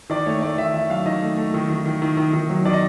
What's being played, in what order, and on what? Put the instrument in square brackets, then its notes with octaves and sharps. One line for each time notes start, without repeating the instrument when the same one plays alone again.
[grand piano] D#3 D5
A3 C#5
A3 D5
D#3 E5
D#3 E5
F#3 F5
D#3 D#5
A3
A3
D#3
D#3
D#3
D#3
D#3
D#3
F#3
D#3 D5
D#5